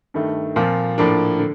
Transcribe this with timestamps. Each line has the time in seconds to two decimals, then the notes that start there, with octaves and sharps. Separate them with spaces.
0.14 G2 D#3 A3
0.56 A#2 F3 C4 F4
0.98 A2 F3 A#3 D4
1.39 D3